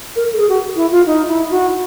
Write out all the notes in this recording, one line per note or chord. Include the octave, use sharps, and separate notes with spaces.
A#4
A4
G#4
F#4
E4
F4
D#4
E4
F#4